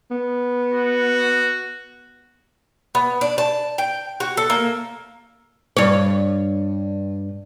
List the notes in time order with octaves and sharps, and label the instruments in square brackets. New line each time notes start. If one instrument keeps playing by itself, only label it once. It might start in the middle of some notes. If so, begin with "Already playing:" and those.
[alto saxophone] B3
[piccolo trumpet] F#4
[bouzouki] B3
D4
A5
G5
F#4
A4
A#3
[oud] G2 C#5